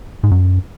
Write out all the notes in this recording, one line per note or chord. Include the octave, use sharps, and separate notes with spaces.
G#2
F#2